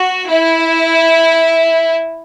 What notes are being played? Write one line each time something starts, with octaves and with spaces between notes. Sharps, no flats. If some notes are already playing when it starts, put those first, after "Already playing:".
Already playing: F#4
E4